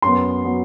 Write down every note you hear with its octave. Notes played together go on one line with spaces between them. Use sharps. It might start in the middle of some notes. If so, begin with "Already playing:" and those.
F#2 F#3 B3 C6
F#3 B3